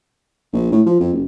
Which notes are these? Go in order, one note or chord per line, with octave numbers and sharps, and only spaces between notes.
A#1
A2
F3
F2
F#1